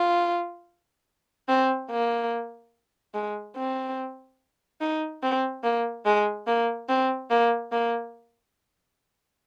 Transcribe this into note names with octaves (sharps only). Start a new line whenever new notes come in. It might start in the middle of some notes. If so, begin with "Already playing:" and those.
Already playing: F4
C4
A#3
G#3
C4
D#4
C4
A#3
G#3
A#3
C4
A#3
A#3